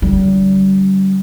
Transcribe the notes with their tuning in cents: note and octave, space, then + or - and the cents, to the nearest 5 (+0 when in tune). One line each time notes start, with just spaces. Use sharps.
D3 -40 G3 -35